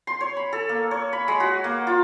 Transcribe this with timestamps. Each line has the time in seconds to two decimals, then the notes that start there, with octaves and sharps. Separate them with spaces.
0.07 C6
0.21 C#5
0.37 B5
0.53 A4
0.69 A#3
0.91 C#5
1.13 B5
1.28 G#3
1.40 F#4
1.64 A#3
1.87 F4